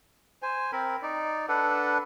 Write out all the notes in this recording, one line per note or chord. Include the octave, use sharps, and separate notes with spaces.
C5 G#5
C4 A#4 B5
D#4 D5
D4 A4 B4 F#5